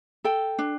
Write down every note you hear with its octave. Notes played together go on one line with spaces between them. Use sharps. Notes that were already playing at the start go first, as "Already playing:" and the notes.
A4 G5
D4